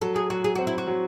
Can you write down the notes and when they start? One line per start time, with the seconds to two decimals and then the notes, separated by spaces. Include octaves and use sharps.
0.01 F#3 A4
0.16 G#4
0.30 F#3 F#4
0.44 G#4
0.55 C4 F#4
0.67 E4
0.78 F#4
0.87 F#3